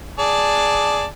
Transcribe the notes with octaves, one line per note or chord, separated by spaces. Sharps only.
G#4 D5 A5